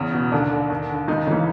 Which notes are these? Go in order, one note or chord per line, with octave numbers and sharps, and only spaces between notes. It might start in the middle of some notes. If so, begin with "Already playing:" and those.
Already playing: E2 C#3
B2
D#2 D3 D4
D3
D#2
D3
C#2 D#3 D#4
C#3 E3